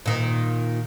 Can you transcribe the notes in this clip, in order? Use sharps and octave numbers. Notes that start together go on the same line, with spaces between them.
A#2 D#3